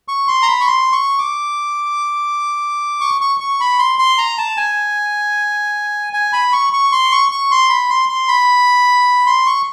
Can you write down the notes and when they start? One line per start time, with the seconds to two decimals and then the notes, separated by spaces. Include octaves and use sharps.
0.08 C#6
0.28 C6
0.43 A#5
0.48 B5
0.61 C#6
0.67 C6
0.92 C#6
1.18 D6
3.01 C#6
3.21 C#6
3.40 C#6
3.60 B5
3.79 C6
3.99 C6
4.18 A#5
4.38 A5
4.57 G#5
6.13 G#5
6.33 B5
6.53 C#6
6.73 C#6
6.92 C6
7.12 C#6
7.31 C#6
7.51 C6
7.70 B5
7.90 C6
8.09 C6
8.28 B5
9.27 C6
9.46 C#6